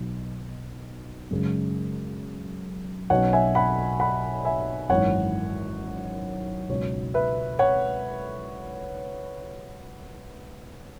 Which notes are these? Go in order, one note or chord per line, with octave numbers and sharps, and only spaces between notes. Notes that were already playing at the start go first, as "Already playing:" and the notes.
Already playing: B1 B2 F#3 B3
F#2 C#3 G#3
B1 B2 F#3 C#4 C#5 F#5
E5 G#5
F#5 B5
F#5 B5
E5 G#5
G#1 F#2 E3 C#5 F#5
C#2 B2 F#3 C#4 C#5
B4 E5
C#5 F#5